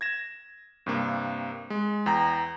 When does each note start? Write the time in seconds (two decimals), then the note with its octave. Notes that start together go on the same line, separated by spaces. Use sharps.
0.01 G#6 A#6 E7
0.86 G2 C3 A#3
1.70 G#3
2.06 E2 G5 A#5